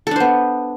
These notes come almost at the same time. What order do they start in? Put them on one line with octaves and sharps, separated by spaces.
A4 D4 C5 B3